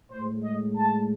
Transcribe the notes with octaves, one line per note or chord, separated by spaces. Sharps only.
A2 G#3 C5
D#5
A5